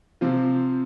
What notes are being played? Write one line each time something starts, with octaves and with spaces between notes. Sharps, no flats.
C3 F3 C4 F4